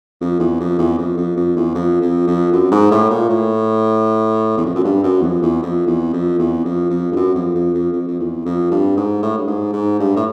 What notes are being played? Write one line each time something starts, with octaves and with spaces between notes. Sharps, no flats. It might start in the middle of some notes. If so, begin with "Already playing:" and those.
F2
E2
F2
E2
F2
F2
F2
E2
F2
F2
F2
F#2
G#2
A2
A#2
A2
E2
F2
F#2
G2
F#2
E2
F2
E2
F2
E2
F2
E2
F2
F2
G2
F#2
F2
F2
F2
F2
F2
E2
F2
G2
G#2
A2
G2
G#2
G#2
G2
A2